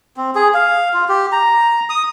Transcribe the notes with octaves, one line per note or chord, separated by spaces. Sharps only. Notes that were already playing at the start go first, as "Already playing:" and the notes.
C4
G#4
F5
F4
G4
A#5
D#6